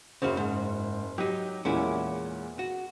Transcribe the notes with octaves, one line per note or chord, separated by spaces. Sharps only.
F#1 C#3 C#4 F#4 C5
G#2
F#3 D#4 G4
E2 A#2 G#3 C#4 E4
F#4